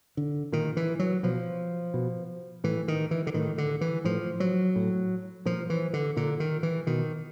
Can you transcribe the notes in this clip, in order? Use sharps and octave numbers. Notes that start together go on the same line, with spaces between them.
D3
A#2 D#3
E3
F#3
B2 F3
B2
A2 E3
D#3
E3
D3
A2 D#3
D3
E3
A2 F3
F#3
A2
A#2 F3
E3
D3
A#2 D3
D#3
E3
B2 D#3